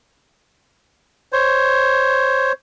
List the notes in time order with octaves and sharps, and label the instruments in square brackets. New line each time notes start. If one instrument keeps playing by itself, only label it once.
[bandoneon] C5 C#5